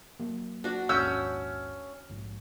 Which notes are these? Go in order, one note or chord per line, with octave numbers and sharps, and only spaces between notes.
F#3 A#3
D4 F#4
A#1 D#2 G#2 C#4 E6 G6
A#1 G#2